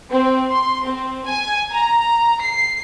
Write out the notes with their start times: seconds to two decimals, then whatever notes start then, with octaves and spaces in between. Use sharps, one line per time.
0.11 C4
0.51 C6
0.83 C4
1.25 G#5
1.72 A#5
2.41 C7